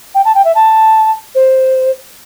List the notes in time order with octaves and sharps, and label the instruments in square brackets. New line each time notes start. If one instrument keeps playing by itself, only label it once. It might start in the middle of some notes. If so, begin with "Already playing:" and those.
[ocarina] G5
A5
G5
E5
A5
C5